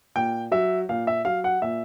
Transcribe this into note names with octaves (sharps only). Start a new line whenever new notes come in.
A#2 G5
F#3 E5
A#2 F5
E5
F#3 F5
F#5
A#2 E5